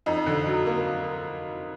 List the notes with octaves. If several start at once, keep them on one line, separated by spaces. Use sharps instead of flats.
F2 D#4
D3
F#3
A#3